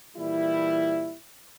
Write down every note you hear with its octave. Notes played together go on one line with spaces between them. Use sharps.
A#2 E3 G3 E4